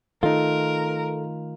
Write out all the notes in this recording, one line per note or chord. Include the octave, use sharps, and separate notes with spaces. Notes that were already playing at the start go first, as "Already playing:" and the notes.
D#3 A3 D#4 F4 A4 A#4